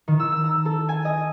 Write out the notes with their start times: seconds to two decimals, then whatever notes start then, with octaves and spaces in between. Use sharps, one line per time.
0.08 D#3
0.20 E6
0.32 E6
0.44 A#5
0.65 A4
0.89 G#5
1.05 D#5